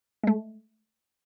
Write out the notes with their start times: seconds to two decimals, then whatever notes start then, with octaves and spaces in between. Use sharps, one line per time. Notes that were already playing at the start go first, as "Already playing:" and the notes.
0.24 G#3 A3